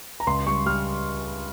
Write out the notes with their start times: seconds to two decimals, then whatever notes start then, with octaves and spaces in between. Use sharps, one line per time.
0.20 A#5
0.27 C#2 C6
0.47 G3 C#6
0.66 G3 F6